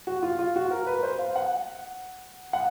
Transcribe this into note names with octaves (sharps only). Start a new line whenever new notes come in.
F#4
F4
F4
F#4
A#4
B4
C5
F5
F#5
F#5